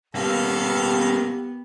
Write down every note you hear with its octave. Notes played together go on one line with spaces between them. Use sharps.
G3 A#3 B3 G4 A4 F5